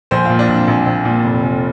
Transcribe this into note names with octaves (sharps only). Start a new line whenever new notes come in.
A#1 C5
A#2 F4
D4
A#1
C4
A#1
A#1
A#2
F1
F1